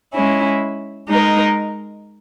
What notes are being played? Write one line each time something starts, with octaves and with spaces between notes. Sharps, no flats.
G#3 C#4 E4
G#3 D#4 A#4